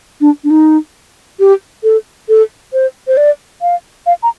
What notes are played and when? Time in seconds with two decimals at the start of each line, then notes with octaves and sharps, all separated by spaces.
0.21 D4
0.44 D4
0.50 D#4
1.39 G4
1.83 A4
2.29 A4
2.73 C5
3.07 C5
3.17 D5
3.62 F5
4.06 F5
4.23 A#5